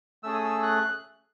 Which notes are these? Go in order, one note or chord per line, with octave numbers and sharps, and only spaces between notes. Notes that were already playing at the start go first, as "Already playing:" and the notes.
A3 C#4 G#4 E6
D#6
E6
F#6